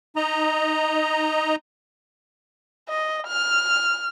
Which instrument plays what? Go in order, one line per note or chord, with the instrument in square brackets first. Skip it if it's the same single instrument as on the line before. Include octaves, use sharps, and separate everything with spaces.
[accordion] D#4 D#5 A#5
[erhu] D#5
F6